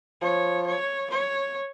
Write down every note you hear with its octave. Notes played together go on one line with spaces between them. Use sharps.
F3 C#5
C#5
C#5